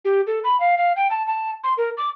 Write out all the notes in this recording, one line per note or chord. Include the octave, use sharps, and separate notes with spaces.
G4
A4
B5
F5
F5
G5
A5
A5
C6
A#4
D6